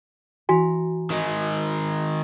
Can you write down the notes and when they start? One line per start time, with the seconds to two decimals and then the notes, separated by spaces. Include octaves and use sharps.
0.49 E3 F#4 G#5 A#5 C#7
1.10 D#3 G#3 D#5